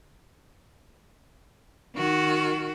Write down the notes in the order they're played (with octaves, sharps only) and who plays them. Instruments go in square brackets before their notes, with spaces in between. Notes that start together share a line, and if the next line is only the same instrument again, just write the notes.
[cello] D#3 F#4